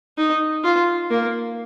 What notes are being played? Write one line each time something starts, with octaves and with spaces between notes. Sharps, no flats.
D#4
F4
A#3